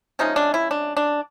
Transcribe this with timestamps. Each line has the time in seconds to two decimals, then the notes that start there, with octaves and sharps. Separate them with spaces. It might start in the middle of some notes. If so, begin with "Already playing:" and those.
0.19 C3 F3 G#3 C#4 D#4
0.36 D4
0.54 E4
0.71 D4
0.97 D4